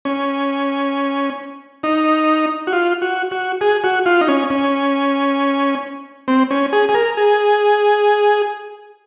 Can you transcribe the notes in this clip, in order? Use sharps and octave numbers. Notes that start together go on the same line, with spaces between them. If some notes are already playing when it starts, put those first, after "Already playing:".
C#4
D#4
F#4
F4
F#4
F#4
G#4
F#4
F4
D#4
C#4
C#4
C4
C#4
G#4
G#4
A#4
G#4